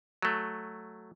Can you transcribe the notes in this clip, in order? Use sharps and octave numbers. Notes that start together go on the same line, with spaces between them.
F#3 A3